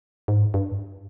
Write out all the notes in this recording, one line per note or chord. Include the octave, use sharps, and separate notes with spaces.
G#2
G2